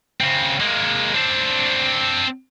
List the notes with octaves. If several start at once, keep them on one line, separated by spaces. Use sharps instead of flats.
C#3 C4
G#3 A#3
C4 D4